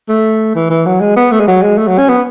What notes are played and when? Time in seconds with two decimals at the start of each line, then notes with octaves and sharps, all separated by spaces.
0.09 A3
0.55 E3
0.70 E3
0.86 F#3
1.00 G#3
1.16 B3
1.32 A3
1.40 G#3
1.48 F#3
1.62 G#3
1.78 A3
1.88 F#3
1.98 C#4
2.09 B3